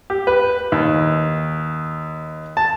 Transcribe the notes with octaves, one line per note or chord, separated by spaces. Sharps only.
G4
B4
D#2
A5